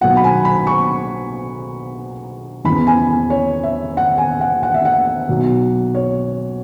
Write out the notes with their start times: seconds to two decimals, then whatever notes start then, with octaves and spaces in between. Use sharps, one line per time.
0.01 B1 B2 F#3 F#5
0.17 B5
0.24 G#5
0.45 B5
0.67 C#6
2.65 E2 C#3 E3 B5
2.87 G#5
3.30 C#5
3.63 E5
3.97 F#5
4.18 G#5
4.41 F#5
4.63 F#5
4.74 E5
4.85 F#5
5.28 B1 B2 F#3
5.95 C#5